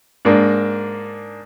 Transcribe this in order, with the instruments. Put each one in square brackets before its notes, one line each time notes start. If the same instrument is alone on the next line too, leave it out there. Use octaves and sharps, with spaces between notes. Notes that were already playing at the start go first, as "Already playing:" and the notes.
[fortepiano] G#2 A#3 D4